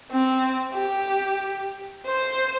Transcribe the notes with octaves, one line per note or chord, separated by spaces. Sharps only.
C4
G4
C5